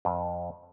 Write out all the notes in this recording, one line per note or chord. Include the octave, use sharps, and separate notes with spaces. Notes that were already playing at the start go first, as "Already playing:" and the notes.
F2